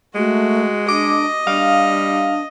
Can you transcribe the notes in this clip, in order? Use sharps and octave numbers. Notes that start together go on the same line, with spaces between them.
G#3 A3 F#4
D4 D#5 D6
G3 D4 F5